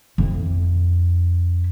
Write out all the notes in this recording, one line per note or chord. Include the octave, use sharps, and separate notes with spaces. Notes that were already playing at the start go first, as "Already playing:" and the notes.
F2 E4